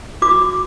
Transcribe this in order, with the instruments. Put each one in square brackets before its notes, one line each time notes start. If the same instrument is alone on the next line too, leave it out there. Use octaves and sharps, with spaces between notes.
[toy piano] F#4 D6